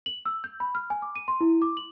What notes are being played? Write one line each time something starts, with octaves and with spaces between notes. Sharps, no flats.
F#7
E6
G6
B5
F6
G#5
D6
D#7
C6
E4
D6
F#7